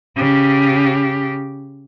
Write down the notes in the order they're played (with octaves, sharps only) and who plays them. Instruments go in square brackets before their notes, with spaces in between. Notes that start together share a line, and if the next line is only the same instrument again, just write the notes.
[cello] C#3 G4